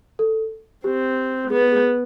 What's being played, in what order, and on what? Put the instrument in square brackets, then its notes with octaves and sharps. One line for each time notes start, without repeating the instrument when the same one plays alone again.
[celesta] A4
[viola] C4 [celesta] G4
[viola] B3 [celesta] G#4
[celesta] G#4